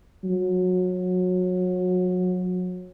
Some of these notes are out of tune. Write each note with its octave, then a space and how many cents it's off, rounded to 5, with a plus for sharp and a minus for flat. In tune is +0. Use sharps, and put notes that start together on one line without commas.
F#3 -25